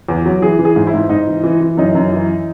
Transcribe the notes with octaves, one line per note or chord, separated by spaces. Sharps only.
E2
F#3
E3 G#4
E3
G#4
G#2
E4
G#2
G#2 D#4
E3
E3
E3
F#2 D#4
F#2
E3